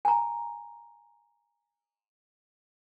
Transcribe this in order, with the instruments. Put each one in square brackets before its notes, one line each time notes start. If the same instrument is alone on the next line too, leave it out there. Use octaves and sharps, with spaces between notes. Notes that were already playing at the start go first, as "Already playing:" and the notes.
[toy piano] G#5 A#5